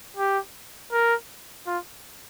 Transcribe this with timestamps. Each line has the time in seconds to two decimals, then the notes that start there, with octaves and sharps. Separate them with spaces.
0.17 G4
0.92 A#4
1.67 F4